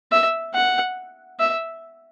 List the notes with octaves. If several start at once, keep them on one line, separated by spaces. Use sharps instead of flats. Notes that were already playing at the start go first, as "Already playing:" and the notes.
E5
F#5
E5